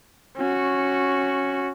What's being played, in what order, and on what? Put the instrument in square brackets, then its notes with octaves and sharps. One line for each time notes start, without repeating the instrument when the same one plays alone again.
[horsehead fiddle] C#4 F#4